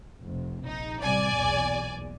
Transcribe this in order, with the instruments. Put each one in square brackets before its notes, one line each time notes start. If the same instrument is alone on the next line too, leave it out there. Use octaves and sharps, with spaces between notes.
[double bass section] F1 C3
[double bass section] A#1 [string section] D#4
[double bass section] A1 C3 G3 [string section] D5 G#5
[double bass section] B1 E2 A#2